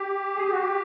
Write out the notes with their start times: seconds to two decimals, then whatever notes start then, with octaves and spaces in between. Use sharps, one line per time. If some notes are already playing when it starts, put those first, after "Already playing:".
Already playing: G4
0.36 G#4
0.44 G4
0.52 F#4
0.59 G4